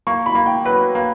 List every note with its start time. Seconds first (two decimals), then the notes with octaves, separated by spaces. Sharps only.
0.07 A#3 C#6
0.26 B5
0.35 A#3
0.46 G5
0.65 F#3 B4
0.95 A#3